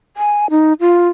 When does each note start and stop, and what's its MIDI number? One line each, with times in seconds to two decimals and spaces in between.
0.17 0.46 80
0.51 0.73 63
0.80 1.08 65